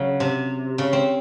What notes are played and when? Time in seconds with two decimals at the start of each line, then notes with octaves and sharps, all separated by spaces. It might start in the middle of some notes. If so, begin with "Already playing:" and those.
Already playing: C#3 F#3
0.20 C3
0.78 C#3
0.93 C4